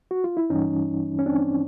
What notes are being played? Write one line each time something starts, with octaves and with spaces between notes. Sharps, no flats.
F#4
F4
E4
G2 E3 G3 C#4 D#4
C#4
C4 D4